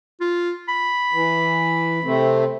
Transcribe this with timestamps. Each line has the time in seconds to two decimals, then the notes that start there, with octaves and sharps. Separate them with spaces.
0.20 F4
0.68 B5
1.13 E3
2.04 C3 A3 C4